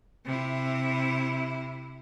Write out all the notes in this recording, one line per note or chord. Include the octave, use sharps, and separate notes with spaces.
C3 E4